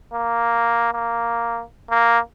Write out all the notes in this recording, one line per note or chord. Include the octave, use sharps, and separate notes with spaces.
A#3
A#3
A#3